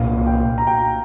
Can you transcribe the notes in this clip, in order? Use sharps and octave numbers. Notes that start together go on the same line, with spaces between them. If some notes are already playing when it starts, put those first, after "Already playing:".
Already playing: C2 A#2 A#3 F5
G5
A#5
G5